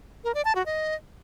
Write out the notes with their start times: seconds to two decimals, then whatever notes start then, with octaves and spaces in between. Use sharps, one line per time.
0.24 A#4
0.35 D5
0.45 A5
0.55 F#4
0.66 D#5